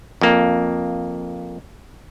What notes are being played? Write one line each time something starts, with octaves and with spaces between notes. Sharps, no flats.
F2 A#3